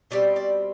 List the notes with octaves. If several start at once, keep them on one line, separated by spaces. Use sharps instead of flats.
B2 G3 C4 D5
D5